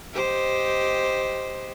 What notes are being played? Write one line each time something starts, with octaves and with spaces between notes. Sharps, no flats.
G4 C5 D#5